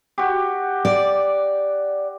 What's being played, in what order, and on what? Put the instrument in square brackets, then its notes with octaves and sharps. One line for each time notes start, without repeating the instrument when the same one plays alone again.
[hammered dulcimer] F#4 G4
[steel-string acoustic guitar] D5